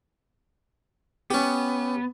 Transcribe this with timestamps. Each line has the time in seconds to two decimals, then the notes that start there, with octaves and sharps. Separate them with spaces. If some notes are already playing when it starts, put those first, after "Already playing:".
1.31 B3 C#4 G4